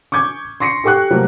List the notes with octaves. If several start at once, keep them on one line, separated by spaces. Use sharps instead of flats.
C#6 D6 G6 G#6
C6 C#6 A#6 C7 C#7
G4 A4 G5 C#6 F#6
C3 F#3 G3 A3 A#3 C4